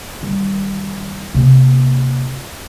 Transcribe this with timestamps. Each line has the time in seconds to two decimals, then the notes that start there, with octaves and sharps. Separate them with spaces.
0.23 D#3 G3
1.34 C3 A#3